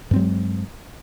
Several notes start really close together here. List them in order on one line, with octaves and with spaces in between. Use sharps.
G2 C4 F#3 G#3